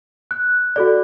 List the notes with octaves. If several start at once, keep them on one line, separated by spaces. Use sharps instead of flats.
F#6
F#4 A4 D5